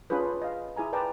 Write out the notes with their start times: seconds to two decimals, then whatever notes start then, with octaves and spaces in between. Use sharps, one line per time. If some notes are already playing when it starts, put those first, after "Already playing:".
0.10 C#4 D4 F4 G#4 B4
0.42 D#5 F5
0.76 E4 G#4 G#5 A#5
0.93 A#4 B4 D5 G5 A5 A#5